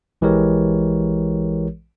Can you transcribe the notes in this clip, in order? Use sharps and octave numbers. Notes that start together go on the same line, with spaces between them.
A#1 E3 G#3 G4 A#4 C#5